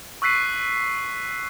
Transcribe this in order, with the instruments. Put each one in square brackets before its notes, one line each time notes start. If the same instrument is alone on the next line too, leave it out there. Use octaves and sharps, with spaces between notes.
[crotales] C#6 E6 F#6 B6 C7 D#7